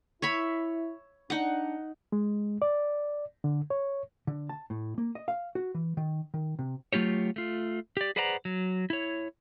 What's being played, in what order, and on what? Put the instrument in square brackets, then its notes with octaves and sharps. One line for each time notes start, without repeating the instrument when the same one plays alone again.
[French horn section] E4 [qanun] C#5 E5 B5
[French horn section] D4 [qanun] D#4 F#5
[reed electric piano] G#3
D5
D3
C#5
[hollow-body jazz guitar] D3
A5
A2
A#3
D#5
F5
F#4
E3
D#3
D#3
C3
[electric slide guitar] F#3 A3 F4 G4 C#5
A3 F4
G4 D5
G#4 B4 C5 D5 F#5 A#5
F#3
E4 C#5